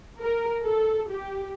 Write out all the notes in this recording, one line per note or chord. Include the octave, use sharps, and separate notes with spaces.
A#4
A4
G4